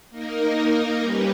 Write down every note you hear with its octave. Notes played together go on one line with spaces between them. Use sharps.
A#3 D#4 A#4
G3 C#4 G4 B4